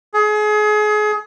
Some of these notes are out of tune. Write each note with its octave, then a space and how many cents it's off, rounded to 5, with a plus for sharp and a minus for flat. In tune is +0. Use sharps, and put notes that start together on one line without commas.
G#4 +30